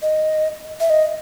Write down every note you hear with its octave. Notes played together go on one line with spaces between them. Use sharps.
D#5
E5
D#5